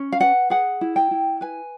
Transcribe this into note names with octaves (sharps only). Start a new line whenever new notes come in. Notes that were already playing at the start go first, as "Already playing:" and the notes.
Already playing: C#4
F5
B4 F#5
G#4 F#5
E4
G5
E4
B4 G#5